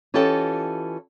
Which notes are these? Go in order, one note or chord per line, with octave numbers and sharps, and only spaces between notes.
E3 C#4 F4 G4 A4 D#5